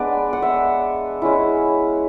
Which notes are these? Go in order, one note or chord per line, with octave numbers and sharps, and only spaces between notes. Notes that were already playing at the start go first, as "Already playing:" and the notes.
Already playing: G#3 B3 D4 B4 D5
F#5
E5
G#3 C#4 E4